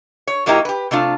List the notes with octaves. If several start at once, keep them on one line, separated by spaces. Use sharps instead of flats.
C#5
A#2 F#3 A#3 D#4 E4 G4
G4 B4
C3 A3 D4 F4